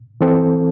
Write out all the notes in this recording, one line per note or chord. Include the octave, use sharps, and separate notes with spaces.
E3 C4 A4